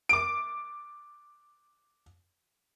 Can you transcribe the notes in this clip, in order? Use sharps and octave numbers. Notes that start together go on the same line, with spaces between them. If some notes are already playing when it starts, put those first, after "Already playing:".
D6 D7